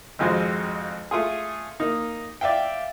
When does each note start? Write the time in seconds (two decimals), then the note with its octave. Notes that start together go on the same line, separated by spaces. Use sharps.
0.19 G#1 F2 G#3 F4 F#4 C5
1.11 A3 F4 G#4
1.80 A#3 D#4
2.41 D5 E5 F5 G5